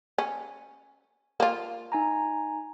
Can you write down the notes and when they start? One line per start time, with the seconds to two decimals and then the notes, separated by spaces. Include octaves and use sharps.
0.18 C#4
1.40 A#3 F4
1.92 D#4 G#5 A#5